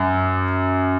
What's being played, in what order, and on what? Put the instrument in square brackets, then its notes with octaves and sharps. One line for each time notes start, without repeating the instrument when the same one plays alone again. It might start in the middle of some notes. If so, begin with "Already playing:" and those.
Already playing: [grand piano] F#2